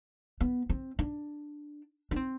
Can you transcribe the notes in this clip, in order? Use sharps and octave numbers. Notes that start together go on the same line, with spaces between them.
B3
C4
D4
D4
C4